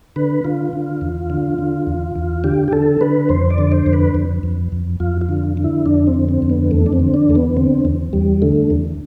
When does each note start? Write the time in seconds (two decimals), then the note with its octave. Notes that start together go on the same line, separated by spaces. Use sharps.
0.16 D3 B4
0.44 D3 F4
0.73 D3
1.01 E2
1.30 D3
1.59 D3
1.87 E2
2.16 E2
2.44 D3 G4
2.68 G4
2.72 D3 A4
3.01 D3 B4
3.29 F2 C5
3.50 D5
3.58 D3
3.72 C5
3.86 F2
3.93 B4
4.15 F2
4.43 F2
4.72 F2
5.00 F2 F4
5.21 F4
5.29 D3
5.57 D3
5.64 E4
5.86 F2 D4
6.07 C4
6.14 D3
6.29 C4
6.42 F2
6.50 B3
6.71 E2 A3
6.86 D4
6.93 C4
7.00 D3
7.14 D4
7.28 E2 A3
7.35 B3
7.57 D3 C4
7.85 E2
8.13 E2 G3
8.42 D3 A3
8.70 E2